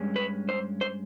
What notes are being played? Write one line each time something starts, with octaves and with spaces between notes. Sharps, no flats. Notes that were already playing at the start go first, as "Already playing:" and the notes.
Already playing: G2 G#3 C#4
B4
C5
C5